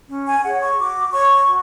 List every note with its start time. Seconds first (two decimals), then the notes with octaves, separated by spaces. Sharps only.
0.09 C#4
0.27 G#5
0.43 G#4 C#5 F#5
0.61 C#6
0.78 F#4 D6
1.12 C#5 C#6
1.46 F#4